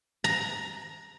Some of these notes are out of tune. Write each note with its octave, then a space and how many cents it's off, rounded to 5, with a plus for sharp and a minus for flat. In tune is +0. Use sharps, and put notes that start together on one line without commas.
A#5 +10